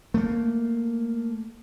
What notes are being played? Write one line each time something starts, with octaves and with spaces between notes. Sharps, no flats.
A3 A#3